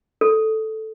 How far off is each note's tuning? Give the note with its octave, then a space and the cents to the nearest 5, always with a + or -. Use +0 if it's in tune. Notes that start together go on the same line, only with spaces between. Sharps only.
A4 -5